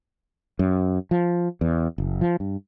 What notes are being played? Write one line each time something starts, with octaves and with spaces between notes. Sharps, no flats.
F#2
F3
E2
F#1
F3
G2